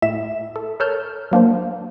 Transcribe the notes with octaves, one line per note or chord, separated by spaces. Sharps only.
A2 E5 E7
A4
A4 A#4 C#5 A5 F6 G6
F#3 A#3 D4 C5